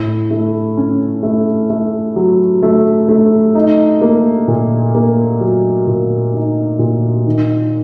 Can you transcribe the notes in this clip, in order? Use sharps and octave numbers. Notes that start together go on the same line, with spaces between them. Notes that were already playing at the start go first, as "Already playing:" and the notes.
Already playing: A2
A3
C#4
A3
A3
F#3
A3
A3
D#4
A#3
A#2
A#3
F#3
A#2
D#4
A#2
D#3